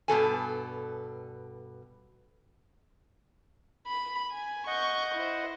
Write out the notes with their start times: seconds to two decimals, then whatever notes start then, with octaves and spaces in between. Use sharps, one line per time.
0.08 G2 B2 A4 G#5
3.87 B5
4.31 G#5
4.67 D#5 F#5 C#6 G6
5.15 E4 C5